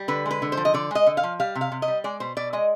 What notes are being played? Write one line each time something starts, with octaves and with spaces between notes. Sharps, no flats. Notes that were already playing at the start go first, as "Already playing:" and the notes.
Already playing: G3
D3 B4
G#3
B4
D3
C5
F3
D#5
D3 D5
G#3 D#5
D3
F5
F3
G3 F5
C3
F5
C3
D#5
G3
G#3 D5
B2 C5
B2 D5
G#3 D#5